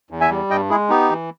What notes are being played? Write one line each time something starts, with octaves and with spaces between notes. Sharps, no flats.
E2
E5 G#5
G3
G2 D#5 G5
G#3 E4 G#4
B3 D#4 G4
E3